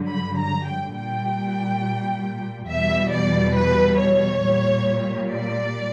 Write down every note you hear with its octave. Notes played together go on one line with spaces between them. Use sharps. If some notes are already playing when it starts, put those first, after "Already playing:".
Already playing: G2 D3 F#3
B5
A#5
G5
A#2 G3 G5
E2 B2 G3 E5
D5
B4
C#5
A#2 G3
D5